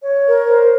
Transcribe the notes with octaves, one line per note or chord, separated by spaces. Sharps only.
C#5
A#4
C5